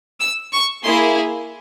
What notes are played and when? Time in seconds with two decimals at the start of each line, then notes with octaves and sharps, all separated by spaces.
0.20 E6
0.52 C#6
0.84 A#3 E4 G#4 C6